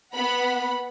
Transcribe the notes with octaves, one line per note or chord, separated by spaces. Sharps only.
B3 F#5 B5